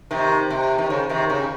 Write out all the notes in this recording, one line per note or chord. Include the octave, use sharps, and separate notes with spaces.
C3 D#3
C3
D#3
C#3
C3 D#3
C#3